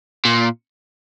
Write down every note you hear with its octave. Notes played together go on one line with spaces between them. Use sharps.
A#2